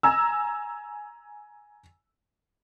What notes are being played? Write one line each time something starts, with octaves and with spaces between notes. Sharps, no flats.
G#5 A#5 E6